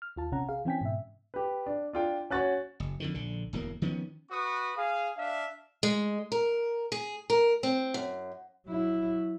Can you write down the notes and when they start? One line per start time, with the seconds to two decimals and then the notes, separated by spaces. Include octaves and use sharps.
0.02 F6
0.16 D#2 F4 A5
0.32 A#1 C3 C#4 F#5 A#5
0.49 G#4 F5
0.65 E3 C4 C#4 G5 G#5 B6
0.81 G#2 B2 E5
1.34 G4 B4
1.66 D4
1.93 D4 F4 G5
2.30 C#4 F#4 C#5 G#5 F#6 A6
2.80 F#1
3.00 F2 D3 D#3
3.14 A#1 D3
3.53 D1 E2 E3 A#3
3.82 D#3 F3 B3 C#4
4.31 F#4 B4 C#6 D#6
4.77 G#4 F5
5.17 D4 E5 F5
5.83 G#3
6.32 A#4
6.92 G#4
7.30 A#4
7.63 C4
7.94 F#2
8.67 F#3 E4